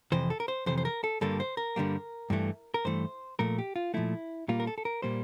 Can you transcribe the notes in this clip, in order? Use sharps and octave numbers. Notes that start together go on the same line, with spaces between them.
F2 C3 E3 C5
A4
A#4
C5
F2 C3 E3 C5
C5
A#4
A4
G2 D3 G3 A#3 A4
C5
A#4
G2 D3 G3 A#3
G2 E3 A3
A#4
G2 E3 A3 C5
A#2 F3 A3 A#4
G4
F4
A#2 F3 A3 E4
A#2 G3 A#3 F4
A#4
A4
A4
A#4
A#2 G3 A#3 C5